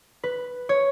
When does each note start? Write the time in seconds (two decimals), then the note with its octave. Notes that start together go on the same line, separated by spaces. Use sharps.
0.24 B4
0.69 C#5